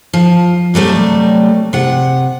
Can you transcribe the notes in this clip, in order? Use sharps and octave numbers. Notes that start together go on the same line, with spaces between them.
F3
C3 F#3 G3 A3
C3 F#5